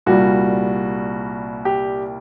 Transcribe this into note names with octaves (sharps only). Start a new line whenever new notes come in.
C2 A#2 G3 F#4
G4